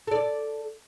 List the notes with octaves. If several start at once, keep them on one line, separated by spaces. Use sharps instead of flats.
A4 D5